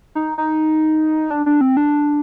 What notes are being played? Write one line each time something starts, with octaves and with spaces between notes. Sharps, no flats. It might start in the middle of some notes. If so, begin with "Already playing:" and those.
D#4
D#4
D4
D4
C4
D4